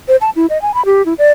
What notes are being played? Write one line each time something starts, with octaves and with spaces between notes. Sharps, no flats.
C5
A5
E4
D#5
G#5
B5
G4
E4
D5